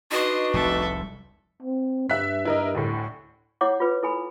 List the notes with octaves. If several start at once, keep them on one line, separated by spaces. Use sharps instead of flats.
D4 D#4 F#4 B4 D#5 C6
F1 C2 A4 E5
C4
G2 E5 F#6 B6
E4 A#4 D#5
D2 A2
E4 C#5 F#5 D6
F4 B4
E4 A4 G#5 B5